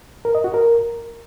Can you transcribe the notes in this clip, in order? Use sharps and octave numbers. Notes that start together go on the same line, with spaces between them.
A#4
D#5
F#4
A#4